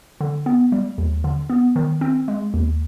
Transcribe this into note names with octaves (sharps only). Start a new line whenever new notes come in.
D3
B3
G3
D#2
D3
B3
D#3
C4
G#3
D#2